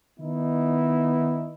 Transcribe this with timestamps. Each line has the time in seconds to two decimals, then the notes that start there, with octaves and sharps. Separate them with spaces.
0.20 D#3 B3 D#4 E4